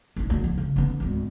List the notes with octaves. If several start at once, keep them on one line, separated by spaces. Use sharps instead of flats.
A1 G#2
D2
F3
C#3
D3 B3
G#1 D2